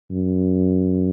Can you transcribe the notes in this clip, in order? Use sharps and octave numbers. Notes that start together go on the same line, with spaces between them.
F#2